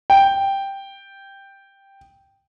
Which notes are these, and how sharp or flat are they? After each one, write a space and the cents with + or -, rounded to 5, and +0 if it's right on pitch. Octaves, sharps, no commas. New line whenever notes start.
G5 +0